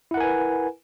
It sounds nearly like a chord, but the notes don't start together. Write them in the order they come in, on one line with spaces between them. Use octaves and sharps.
E4 F#5 A#4 G#5 B4